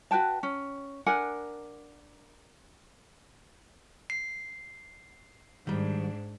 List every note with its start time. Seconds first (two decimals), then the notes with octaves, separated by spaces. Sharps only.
0.11 F#4 B4 G5 A5
0.43 C#4
1.06 D4 A#4 F#5 G#5
4.10 C7
5.67 G#2 D#3 G3 D4